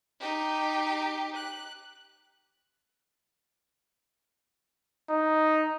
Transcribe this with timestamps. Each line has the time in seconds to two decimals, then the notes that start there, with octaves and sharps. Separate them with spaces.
0.20 D#4 G4
1.36 F#6
5.10 D#4